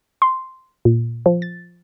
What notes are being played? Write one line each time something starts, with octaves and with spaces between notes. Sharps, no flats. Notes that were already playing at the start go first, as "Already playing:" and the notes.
C6
A#2
F3
A6